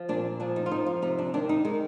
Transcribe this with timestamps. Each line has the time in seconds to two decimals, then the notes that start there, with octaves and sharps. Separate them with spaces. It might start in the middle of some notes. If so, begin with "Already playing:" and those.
Already playing: F3
0.09 A#2 D4
0.40 F3 D4
0.56 D#4
0.66 F4
0.72 F3 D#4
0.86 F4
1.02 C3 D#4
1.18 D4
1.34 D#3 D4
1.49 D#4
1.65 D#3 G#3